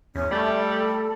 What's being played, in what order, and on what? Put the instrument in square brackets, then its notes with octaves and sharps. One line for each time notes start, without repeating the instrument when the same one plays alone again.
[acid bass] E2 [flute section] C#4
[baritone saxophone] G3 [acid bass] A3 [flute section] A4